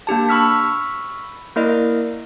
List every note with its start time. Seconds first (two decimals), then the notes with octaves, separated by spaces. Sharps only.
0.07 A#3 D4 G4 A5
0.29 B5 C#6 E6 F6 B6
1.56 A#3 E4 A#4 D5 D#5